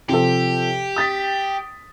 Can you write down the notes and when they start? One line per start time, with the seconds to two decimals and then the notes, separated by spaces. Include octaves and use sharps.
0.09 C3 F3 G4 A4
0.96 D#6 A6 B6